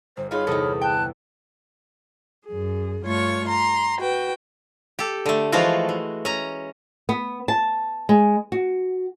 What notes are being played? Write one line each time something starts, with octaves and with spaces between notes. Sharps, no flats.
G1 C5
B3 D#4 F4 G#4 C#5 B5 F6
E2 C3 D#4 A4 D#6
G5 A5 F#6
F#2 G#4
G2 A3 F4 C#5 C#6
A#5 C6
F#4 B4 G5
G4 A4
D3 A3
E3 F3 G#3 A3 F4 F#4
E3
C#4 A#5
B3
A5
G#3
F#4